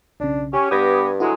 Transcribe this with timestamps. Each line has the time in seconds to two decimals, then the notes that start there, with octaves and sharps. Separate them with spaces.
0.20 B1 C#3 D4
0.53 C#4 G4
0.71 G2 B3 G4 D#6 G#6 A#6
1.20 D3 F#3 G#3 E4 F#4